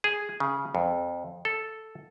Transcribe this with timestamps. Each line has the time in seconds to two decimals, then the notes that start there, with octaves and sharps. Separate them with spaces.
0.04 G#4
0.40 C#3
0.75 F2
1.45 A4